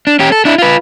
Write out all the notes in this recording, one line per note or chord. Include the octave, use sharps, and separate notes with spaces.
D4
C#4 G4
A4
D4 E4
F4 B4